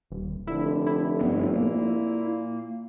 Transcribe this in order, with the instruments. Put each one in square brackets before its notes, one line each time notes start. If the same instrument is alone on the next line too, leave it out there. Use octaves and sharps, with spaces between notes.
[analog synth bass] D#1
[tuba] F1 [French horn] D3 [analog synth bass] E4
[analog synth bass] E4
[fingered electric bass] G2 B3 C4
[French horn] A#2 [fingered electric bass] A#3